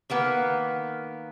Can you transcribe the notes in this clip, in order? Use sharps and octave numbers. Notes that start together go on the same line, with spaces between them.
D#3 A#3 B3